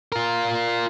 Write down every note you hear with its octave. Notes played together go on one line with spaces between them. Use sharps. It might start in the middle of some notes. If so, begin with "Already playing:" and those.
F4 A#4